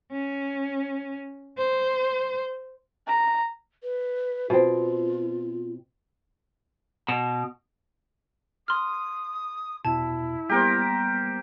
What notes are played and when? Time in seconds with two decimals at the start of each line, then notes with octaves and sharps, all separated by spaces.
0.12 C#4
1.58 C5
3.07 A#5
3.83 B4
4.50 B2 C4 F4
7.08 B2
8.68 C6 D#6 F6
9.85 E2 B2 E4 A5
10.49 G3 A#3 B3 G4 A#4 C5